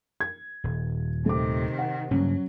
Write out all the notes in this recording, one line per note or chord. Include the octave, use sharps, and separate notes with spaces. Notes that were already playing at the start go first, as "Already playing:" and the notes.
G#6
D#1
C3 D#3 A3 D6
F#5
G2 C#3 F#3 A#3 C#4